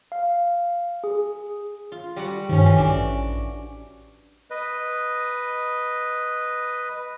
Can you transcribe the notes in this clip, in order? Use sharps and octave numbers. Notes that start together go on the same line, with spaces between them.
F5
G#4
F4
G3 F#4 F#5
G2 D#3 F3 C#4
E3
A1 D4 F#4
B4 D#5